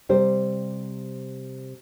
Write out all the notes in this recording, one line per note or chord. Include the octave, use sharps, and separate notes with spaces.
C3 G3 C5